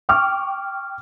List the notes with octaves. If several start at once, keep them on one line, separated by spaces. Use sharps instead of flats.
G5 C#6 D6 F6